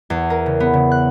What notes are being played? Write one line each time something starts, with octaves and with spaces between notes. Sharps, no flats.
E2
A#4
C#3
B3
C#3
F#6